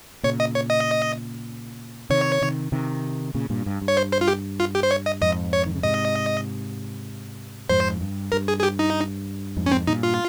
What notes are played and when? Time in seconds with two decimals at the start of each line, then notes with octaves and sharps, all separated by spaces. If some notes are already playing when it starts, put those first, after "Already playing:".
0.23 A#2 C#3 C#5
0.40 D#5
0.55 C#5
0.70 D#5
2.10 C3 D#3 C#5
2.42 C3 D#3
2.72 C3 D#3
3.35 A#2 C#3
3.50 G2 A#2
3.66 G2
3.81 G2
3.88 C#5
3.97 C5
4.13 C5
4.21 F4
4.28 G4
4.60 F4
4.75 G4
4.83 C5
4.91 C#5
5.06 D#5
5.21 F2 G#2 D#5
5.53 C#5
5.66 D#3
5.75 C#3
5.83 G#2 C3 D#5
7.69 F2 G#2 C5
8.01 G2
8.32 G2 A#4
8.48 G#4
8.59 G#4
8.63 G4
8.79 D#4
9.57 F2 G#2
9.66 C#4
9.72 C4
9.87 G2 A#2 D#4
10.03 F4